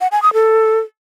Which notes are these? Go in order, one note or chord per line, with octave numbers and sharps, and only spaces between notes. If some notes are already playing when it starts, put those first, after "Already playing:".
F#5
G#5
D#6
A4